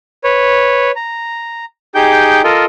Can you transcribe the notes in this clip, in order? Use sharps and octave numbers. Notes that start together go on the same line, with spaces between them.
B4 C#5
A#5
D#4 G4 G#4 G5 G6
F4 A4 A#4 D#5